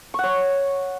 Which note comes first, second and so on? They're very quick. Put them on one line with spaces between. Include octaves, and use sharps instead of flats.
C#6 F#5 C#5